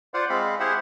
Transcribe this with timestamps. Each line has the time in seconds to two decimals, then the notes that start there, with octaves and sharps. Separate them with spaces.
0.14 F4 C5 D5 F5 F#5
0.30 G#3 C4 F5 B5
0.60 E4 G4 G#4 C5 E5 F#5